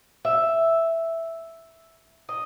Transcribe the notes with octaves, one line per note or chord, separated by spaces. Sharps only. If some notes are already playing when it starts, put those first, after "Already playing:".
E5
D#5